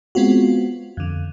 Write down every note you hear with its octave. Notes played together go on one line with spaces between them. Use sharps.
G#3 B3 C4 F4 F#4
F2 D3